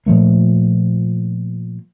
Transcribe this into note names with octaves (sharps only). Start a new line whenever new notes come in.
A#2 F3 A3 A#3